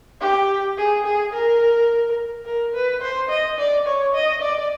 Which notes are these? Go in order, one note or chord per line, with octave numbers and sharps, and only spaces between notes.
G4
G#4
G#4
A#4
A#4
B4
C5
D#5
D5
C#5
D#5
D5